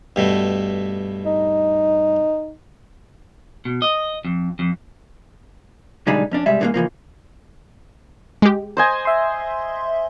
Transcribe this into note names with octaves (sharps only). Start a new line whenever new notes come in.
G2 B2 A3
D#4
B2
D#5
F2
F2
B1 D3 G3 G#3 D#4 B5
F2 C#4 D4
C3 G3 G#3 E5
G#2 D3 E3 F#3 G#3 A#3
C#2 E3 F3 A#3
G#3 G4
C5 D#5 G#5
E5 C6